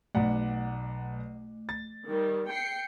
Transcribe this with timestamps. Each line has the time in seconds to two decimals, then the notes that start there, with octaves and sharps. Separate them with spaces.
0.15 B1 A3 D5 F#5
1.69 A6
2.09 D#3 G3
2.51 G5 C7 C#7